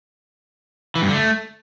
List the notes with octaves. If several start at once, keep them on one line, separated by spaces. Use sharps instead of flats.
E3
G2
D3
A3